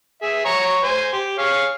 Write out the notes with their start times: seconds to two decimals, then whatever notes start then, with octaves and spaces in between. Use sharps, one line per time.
0.22 G#4 E5
0.45 C#5 A#5 C#6
0.83 C5 G#5
1.13 G4
1.38 G#4 C#5 F5